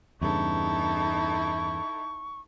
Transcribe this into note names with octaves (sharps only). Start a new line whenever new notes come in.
E2 G2 C#3 D#4 E4 A4 C#6